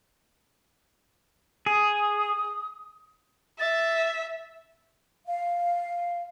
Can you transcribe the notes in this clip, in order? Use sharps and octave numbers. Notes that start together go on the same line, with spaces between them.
G#4 D#6
E5 A6
F5